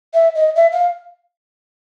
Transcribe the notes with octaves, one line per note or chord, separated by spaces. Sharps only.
E5
D#5
E5
F5